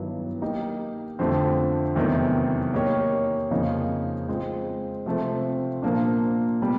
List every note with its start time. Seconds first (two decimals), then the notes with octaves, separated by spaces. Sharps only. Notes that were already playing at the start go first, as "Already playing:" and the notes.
Already playing: G2 D#3 F#3 B3 E4
0.42 A#3 D#4 G4
1.19 F2 D3 F3 A3 C4
1.96 E2 C3 D#3 F#3 A3
2.73 A#3 D#4 G4 A#4 C#5
3.51 F2 C#3 F3 A#3 D#4
4.28 G#3 C4 F4
5.06 C3 F3 A3 C4
5.82 A#2 F3 A#3 D4
6.62 B2 G3